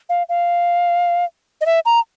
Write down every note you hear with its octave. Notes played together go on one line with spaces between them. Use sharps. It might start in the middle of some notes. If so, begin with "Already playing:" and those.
F5
F5
D#5
E5
A#5